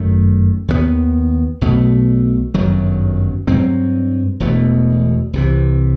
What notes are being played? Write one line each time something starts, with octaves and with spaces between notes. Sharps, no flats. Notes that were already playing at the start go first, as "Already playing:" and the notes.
Already playing: G1 F#2 D#3 A3
D#2 D#3 F#3 B3
B1 B2 A3
G1 F#2 D#3 F#3
G2 F#3 C4
E1 E2 B2 A3
C2 C3 E3